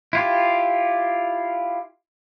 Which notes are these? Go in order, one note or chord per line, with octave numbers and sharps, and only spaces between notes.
E4 F4 G4